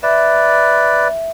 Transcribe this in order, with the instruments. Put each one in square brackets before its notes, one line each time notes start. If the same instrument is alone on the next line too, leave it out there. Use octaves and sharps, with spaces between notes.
[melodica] B4 D5 [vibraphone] E5